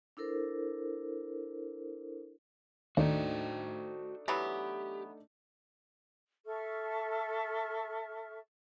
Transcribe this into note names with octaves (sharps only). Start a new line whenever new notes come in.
D4 E4 A4 A#4 C5
D#2 A3 D4 D#4 F#4 C5 G5
E3 F#3 B3 G4
A4 E5 C#6 F6